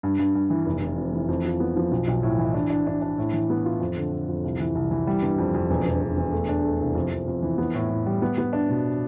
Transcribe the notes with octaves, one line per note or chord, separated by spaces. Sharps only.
G2
G2
G2
E3
F1
F1
F2
E3
F2
F3
B3
F3
B1
B1
A2
E3
D4
D4
D4
D4
A2
E3
B3
F4
F2
D3
D3
F2
C2
E3
C2
E3
G3
G1
F2
F2
E1
E1
E1
E1
A3
D4
A3
C2
F2
F2
F2
E3
B3
A2
A2
G3
B3
B3
D4
B2